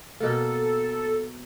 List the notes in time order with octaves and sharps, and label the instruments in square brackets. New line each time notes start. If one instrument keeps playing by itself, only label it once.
[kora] B2 A#3 [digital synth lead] A4